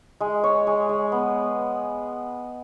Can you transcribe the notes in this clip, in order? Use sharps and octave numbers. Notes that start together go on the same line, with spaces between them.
G#3
C#5
G#3
G#3
B3